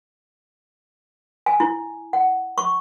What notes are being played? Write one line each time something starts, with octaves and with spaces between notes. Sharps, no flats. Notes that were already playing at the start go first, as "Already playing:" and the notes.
G#5
E4
F#5
C#6